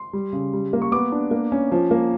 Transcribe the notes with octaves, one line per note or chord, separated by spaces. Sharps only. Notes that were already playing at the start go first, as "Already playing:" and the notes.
Already playing: C6
G3
C#3
G3
A#3
C#6
B3 D6
D4
A#3
C#4
F3
A#3